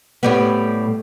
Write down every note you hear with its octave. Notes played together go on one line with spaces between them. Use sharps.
A2 G3 B3